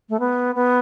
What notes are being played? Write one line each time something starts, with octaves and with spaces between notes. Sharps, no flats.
A3
B3
B3